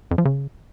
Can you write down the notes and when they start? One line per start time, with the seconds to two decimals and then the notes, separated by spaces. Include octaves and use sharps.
0.11 F2
0.18 F3
0.25 C#3